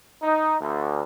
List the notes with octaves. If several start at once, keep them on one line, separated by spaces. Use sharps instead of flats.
D#4
D2